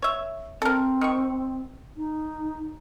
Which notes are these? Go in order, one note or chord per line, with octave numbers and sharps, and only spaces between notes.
C#5 E5
C4 A4 A#4
D#3 C#6
D#4